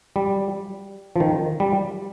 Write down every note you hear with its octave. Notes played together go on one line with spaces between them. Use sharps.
G3
F3
D#3
G3